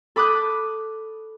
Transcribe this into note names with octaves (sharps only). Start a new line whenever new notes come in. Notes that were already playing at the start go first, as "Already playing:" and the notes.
A4 B5 D6 D#6 F#6 G6